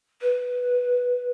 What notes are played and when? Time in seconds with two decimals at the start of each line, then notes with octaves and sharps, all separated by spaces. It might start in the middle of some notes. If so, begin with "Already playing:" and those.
0.22 B4